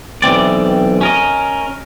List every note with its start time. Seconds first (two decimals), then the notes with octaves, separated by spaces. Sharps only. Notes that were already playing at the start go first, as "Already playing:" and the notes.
0.22 B1 E3 C4 D5
1.01 C#4 A#4 D#5